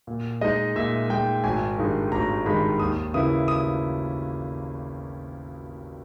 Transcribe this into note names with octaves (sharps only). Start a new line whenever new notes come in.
A#2
G#3 D#4 D#5
A#2 E5
G#3 D#4 G5
G#1 G#5
G2 D#3 G#3 D#4
G#1 A#5
G2 D#3 G#3 D#4 B5
D#2 D#6
C#3 E3 A#3 E4 D#6
D#6